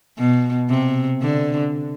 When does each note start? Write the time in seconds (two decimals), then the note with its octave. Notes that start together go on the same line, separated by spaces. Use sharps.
0.18 B2
0.70 C3
1.21 D3